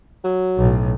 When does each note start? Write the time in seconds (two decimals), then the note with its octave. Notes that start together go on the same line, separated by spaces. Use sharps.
0.24 F#3
0.58 B1 A2